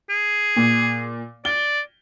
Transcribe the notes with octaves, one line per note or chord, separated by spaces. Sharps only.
G#4
A#2
D5 G7